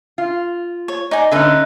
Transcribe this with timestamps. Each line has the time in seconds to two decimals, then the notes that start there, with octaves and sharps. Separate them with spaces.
0.18 F4
0.88 C#5
1.11 D#4 D5 G#5
1.31 D3 C#4 D#4 B4 E5